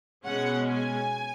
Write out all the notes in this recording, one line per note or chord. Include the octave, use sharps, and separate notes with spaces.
B2 G#3 C#4 F#5
G#5